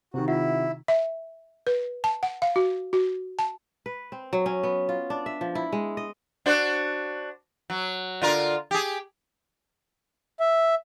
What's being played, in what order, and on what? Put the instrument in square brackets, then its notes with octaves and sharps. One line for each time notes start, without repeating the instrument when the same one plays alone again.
[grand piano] C3 D#3 [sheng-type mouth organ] F#4
[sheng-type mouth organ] E4 [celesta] F4 E5 F#5
[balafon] E5
B4
A5
F#5
F5
F#4
F#4
A5
[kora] B4
C4
F#3
C#4
B3
F4
D4
E5
F3
E4
G#3
D#5
[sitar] D4 F#4 C5
F#3
D3 F4 A#4
G4 G#4
[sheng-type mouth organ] E5